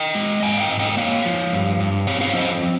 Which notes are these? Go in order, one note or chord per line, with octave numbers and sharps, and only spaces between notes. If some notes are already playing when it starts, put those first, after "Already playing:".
Already playing: D#5 G5
G#3
G#2 F5 G#5
D#5 G5
G#2
D#5 G5
A#3 C#5 F5
F3
G2
G2
C4 C#5 F5
C#5 F5
F3 C5 D#5